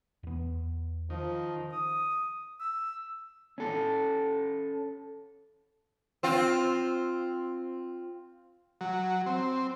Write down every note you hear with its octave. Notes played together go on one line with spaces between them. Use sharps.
E2 B3
D#3 F3
D#6
E6
C#4 A4
C4 F4
F#3
C4